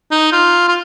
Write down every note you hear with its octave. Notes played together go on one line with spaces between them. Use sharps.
D#4
F4
F4